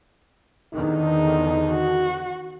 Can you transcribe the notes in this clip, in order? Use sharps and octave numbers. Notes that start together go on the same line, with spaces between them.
E2 D3 D#3 D#4
F#4